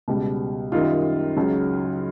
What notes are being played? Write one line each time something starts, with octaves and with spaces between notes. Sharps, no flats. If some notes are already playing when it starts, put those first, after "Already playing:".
C#2 B2 G3
F#2 D#3 G3 D#4 F4
C#2 C#3 F#3